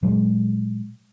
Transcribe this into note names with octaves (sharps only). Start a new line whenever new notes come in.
A#2 F#3 G#3